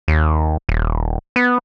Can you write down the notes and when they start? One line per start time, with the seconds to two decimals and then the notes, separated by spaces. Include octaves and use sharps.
0.08 D#2
0.69 D#1
1.36 B3